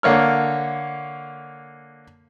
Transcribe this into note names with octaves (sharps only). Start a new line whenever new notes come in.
D3 A#3 C#5 F6